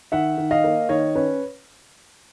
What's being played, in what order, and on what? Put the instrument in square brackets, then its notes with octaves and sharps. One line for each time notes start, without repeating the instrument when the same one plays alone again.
[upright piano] D#3 E5 F#5
D#3
D#5 F5
A#3
D#3 C#5 D#5
C#4 B4 C#5